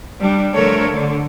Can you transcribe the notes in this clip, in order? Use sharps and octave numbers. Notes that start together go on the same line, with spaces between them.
G3 D4
D3 F3 A3 A4 A#4 C#5
D3